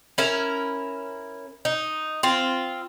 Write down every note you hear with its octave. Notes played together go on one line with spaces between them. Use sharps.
C#4 E4 A#4
D#4
C4 F4